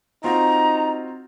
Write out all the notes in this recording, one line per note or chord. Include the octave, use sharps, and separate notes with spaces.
C4 D#4 F4 F#4 A#5